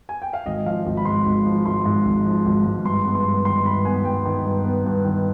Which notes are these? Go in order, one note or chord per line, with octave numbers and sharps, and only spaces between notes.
G#5
G5
F5
G#1 D#5
F3 F5
G#1
B5
G#2 C6
G#1
F3
G#1 C6
G#2
G#1
F3
G#1
G#2
G2 C6
B3
C6
G2
D#3 C6
G2 B5
B3 G#5
G2 G5
D#3
G2
B3
G2
D#3